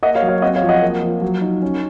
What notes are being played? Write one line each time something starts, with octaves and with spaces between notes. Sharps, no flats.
A#3 D#5 F#5
C#5 F5
F#3
C#5 F5
C4 D#5 F#5
C#5 F5
F3
D#5 F#5
A#3
F3
F#3
D#4
C#4